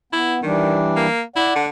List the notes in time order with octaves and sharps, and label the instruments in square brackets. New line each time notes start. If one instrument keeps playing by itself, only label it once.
[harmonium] B3 [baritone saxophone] E4
[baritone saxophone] D#3 [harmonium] E3 G3 D4
[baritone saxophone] A#3
[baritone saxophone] E4 [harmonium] D5 F#5
[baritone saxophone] D3